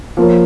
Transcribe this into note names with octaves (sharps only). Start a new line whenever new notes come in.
F3 A#3 F4 A#4 C#5